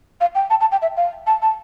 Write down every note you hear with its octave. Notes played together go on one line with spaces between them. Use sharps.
F5
G5
A5
A5
G5
E5
F5
A5
A5